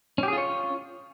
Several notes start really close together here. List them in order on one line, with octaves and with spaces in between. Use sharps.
C#4 G4 G#4 F4 C#5